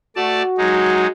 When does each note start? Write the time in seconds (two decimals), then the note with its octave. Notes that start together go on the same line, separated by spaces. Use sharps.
0.16 A3 F#4 D5 A5
0.57 F#3 G#3 D#4